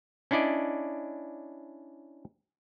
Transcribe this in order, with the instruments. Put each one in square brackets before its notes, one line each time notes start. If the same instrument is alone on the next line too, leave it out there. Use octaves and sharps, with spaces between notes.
[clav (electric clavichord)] C#4 D4 E4 D5 D#5